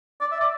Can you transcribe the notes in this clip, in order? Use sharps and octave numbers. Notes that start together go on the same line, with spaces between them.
D5
E5
D5